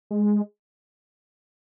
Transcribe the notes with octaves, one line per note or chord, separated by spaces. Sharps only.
G#3